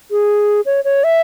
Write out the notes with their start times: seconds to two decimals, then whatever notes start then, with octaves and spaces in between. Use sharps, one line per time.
0.11 G#4
0.66 C#5
0.84 C#5
1.04 E5